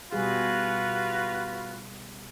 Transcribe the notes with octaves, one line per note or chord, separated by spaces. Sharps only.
B2 G3 F4 F#4 G#4 B4